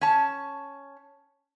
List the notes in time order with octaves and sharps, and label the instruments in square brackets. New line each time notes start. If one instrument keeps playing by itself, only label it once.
[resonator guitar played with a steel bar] C#4 A5